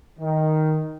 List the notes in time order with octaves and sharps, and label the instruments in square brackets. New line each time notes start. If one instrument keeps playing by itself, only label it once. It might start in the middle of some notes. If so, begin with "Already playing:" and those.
[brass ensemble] D#3